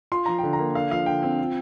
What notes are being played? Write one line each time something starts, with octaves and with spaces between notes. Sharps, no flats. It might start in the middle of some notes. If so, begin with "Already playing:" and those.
F4 C6
F3 A#5
D3 G5
A#5
A#3
D3 F5
F3 F5
D3 G5
C4
F4